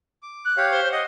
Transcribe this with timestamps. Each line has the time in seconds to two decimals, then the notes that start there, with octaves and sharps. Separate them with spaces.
0.23 D6
0.45 F#6
0.57 G4 C#5 F5
0.71 C5
0.92 D#5 F#5